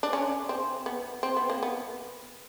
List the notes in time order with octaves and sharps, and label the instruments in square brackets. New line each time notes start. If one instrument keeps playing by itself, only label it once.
[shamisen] D4
C#4
C4
B3
C4
B3
A#3
B3